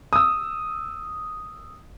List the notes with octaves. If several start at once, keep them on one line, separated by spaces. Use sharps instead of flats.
D#6 E6